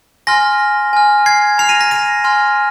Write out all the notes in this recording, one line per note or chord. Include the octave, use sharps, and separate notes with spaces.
G#5 C6 F6 A#6
G#5 F6
G#6 C7
A#5 F6 C7 F7
A#6 D#7
A#6
A#6 D#7
G#5 C6 F6